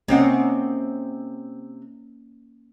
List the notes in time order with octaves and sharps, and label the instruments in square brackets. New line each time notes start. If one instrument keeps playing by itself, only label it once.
[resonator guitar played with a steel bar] C3 C4 F#5 [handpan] A#3 C#4 D#5